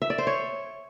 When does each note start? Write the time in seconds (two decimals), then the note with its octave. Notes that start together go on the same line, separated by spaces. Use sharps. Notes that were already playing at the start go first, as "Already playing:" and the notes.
0.02 E5
0.10 D5
0.18 C5
0.27 C#5